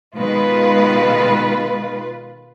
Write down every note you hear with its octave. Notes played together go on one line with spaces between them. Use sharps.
B2 D#3 G#3 F4 B4